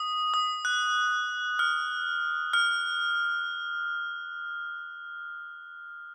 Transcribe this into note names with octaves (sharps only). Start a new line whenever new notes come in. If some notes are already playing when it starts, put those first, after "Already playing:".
Already playing: D#6
D#6
F#6
F6
F6